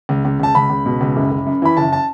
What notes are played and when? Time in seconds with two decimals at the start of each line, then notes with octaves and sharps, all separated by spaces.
0.09 C#2
0.25 C#2
0.40 C#2 A5
0.55 C#2 B5
0.70 C#2
0.86 B2
1.01 C#2
1.16 F#1
1.31 F#1
1.46 F#2
1.62 E3 B5
1.77 F#1 A5
1.93 A5